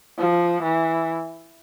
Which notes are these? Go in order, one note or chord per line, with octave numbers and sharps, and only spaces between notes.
F3
E3